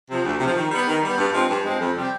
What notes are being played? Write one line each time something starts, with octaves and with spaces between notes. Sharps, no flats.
C3 F3
D2
C3
F3
D#3
G3 B3
D#3
G3 B3
G2
F3 G#3 C4
G2
F3 G#3 C4
F2
C3 G3 C4 G4